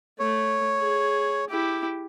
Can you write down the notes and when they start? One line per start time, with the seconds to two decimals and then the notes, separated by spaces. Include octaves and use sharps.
0.19 A3 C#5
0.77 G#4
1.50 E4 G4